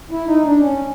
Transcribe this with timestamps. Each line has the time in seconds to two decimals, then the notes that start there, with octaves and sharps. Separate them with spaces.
0.11 E4
0.28 D#4
0.44 D4
0.61 C#4